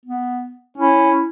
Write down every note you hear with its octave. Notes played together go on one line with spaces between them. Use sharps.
B3
C#4 E4